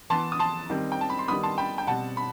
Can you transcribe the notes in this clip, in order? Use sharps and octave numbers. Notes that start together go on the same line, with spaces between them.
E3 B3 A5 C6
D#6
A5 C6
D#3 G3 C4
G5
A5
B5
C6
D#3 G3 B3 B5 D#6
A5 C6
G5 B5
G5
B2 G3 C4 F#5 A5
B5